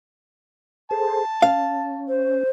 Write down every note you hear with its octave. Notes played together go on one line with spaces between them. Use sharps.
G#4 A4 C5 A5
C#4 F5
C5